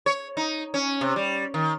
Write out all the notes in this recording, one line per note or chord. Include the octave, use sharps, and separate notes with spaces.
C#5
D#4
C#4
C3
G3
D#3